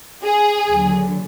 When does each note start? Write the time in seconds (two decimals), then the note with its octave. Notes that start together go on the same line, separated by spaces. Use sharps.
0.24 G#4
0.68 D#2 D3 F#3